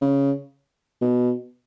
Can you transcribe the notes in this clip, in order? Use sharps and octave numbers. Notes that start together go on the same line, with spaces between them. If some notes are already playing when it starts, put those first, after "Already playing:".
C#3
B2